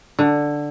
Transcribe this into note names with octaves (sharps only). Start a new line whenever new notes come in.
D3